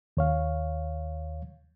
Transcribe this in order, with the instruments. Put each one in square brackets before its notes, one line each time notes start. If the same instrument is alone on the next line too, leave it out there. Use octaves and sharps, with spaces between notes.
[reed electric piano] D#2 C#5 F5